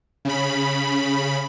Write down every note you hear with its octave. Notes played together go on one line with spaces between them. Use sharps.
C#3 B5